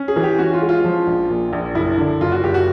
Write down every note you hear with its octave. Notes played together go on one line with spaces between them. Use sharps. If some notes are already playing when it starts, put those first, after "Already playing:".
Already playing: C#4
G#4
E3
G4
C#4 F#4
F4
G#3
F4
F3
A#1
A#2
A#1
F#1 E4
D3
F#1 F4
F#4
F#1 G4
F#4